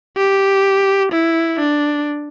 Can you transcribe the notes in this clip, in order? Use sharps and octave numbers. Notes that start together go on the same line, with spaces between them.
G4
E4
D4